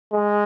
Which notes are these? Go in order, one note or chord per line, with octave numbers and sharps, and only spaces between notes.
G#3